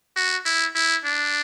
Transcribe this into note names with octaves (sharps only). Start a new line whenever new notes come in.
F#4
E4
E4
D4